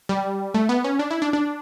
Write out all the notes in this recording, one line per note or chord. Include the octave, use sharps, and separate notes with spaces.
G3
A3
B3
C#4
D4
E4
D4
D4